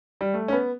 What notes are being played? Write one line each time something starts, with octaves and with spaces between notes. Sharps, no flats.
G3
A3
C#4
B3